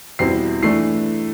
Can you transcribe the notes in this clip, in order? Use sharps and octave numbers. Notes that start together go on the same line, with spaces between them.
E2 B2 G3 C4 E4 C7
E3 A3 D4 C7